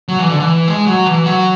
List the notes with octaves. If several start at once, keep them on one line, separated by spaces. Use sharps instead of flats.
F#3
E3
D3
E3
G#3
F#3
E3
F#3